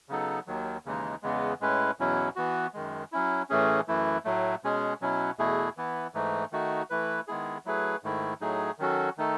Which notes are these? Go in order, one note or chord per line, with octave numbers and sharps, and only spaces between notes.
C#3 F#3 B3 D#4 A4
D#2 D#3 F#3
D#2 C#3 E3 G#3 D#4
E2 C#3 E3 G#3 B3
A2 G#3 C#4 E4 B4
E2 B2 F#3 C#4 E4
E3 B3 F#4
F#2 D#3 G#3
F#3 C#4 E4
A2 E3 A3 C#4 G#4
F#2 E3 A3 E4
A2 F#3 A3
B2 G#3 C#4 G#4
B2 F#3 C#4 E4
E2 B2 A3 E4 G#4
E3 B3 E4
G#2 E3 A3 D#4
D#3 A3 D#4 F#4
E3 A3 E4 B4
D#3 G#3 B3 E4 G#4
F#3 A3 E4 G#4 B4
G#2 D#3 A3 E4
A2 F#3 A3 D#4 G#4
D#3 F#3 C#4 F#4 A4
D#3 A3 D#4 A4